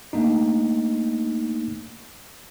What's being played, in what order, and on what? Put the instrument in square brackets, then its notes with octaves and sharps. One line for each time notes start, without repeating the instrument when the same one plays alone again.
[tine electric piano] A3 A#3 D4 D#4